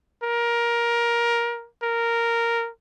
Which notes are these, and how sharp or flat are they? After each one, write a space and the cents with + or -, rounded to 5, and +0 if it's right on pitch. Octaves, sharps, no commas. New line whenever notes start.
A#4 +15
A#4 -5